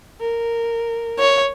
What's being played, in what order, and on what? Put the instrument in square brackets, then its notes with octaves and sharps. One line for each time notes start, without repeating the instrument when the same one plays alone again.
[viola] A#4
[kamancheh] C#5